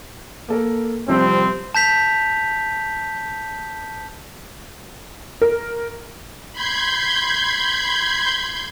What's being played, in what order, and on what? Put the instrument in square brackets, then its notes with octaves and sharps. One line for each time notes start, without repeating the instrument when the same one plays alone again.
[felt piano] A#3 A4 A#4
[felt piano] C3 F3 G3 [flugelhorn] C4
[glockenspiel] A5 G6 B6 F7
[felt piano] A#4
[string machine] B5 C6 G6 G#6